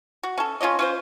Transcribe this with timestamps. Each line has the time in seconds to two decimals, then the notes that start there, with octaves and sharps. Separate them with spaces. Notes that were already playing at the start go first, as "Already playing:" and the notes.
0.23 F#4
0.38 C#4 A4
0.61 C#4 F4 C#5 D#5
0.79 C#4 F4 C5